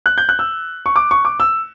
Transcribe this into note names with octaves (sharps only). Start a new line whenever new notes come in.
F#6
G6
F#6
E6
C#6
D6
C#6
D6
E6